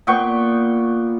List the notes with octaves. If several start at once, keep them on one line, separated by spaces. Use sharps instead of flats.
A#2 B3 G5 C#6